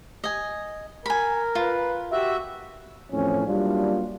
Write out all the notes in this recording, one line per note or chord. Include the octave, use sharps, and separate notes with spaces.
D#5 G#5
A#4 G#5 B5
F4 B4
F#4 G4 E5
E2 A2 E3 F3 C4 C#4
F#3 G3 A#3 D4 E4 F4